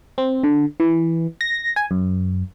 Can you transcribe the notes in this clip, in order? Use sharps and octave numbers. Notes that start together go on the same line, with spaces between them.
C4
D3
E3
A#6
G#5
F#2